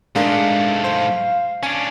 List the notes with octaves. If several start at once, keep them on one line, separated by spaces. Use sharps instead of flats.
G#2 G#3 A3 D4 A#4 F5
C5
C#4 D4 G#5